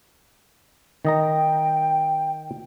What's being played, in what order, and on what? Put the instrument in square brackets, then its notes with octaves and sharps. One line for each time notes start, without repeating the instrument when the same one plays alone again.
[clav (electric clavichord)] D#3 D#5 A#5 [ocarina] G5